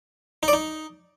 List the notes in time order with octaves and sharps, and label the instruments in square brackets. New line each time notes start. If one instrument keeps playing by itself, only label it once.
[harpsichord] D#4
D5
D#4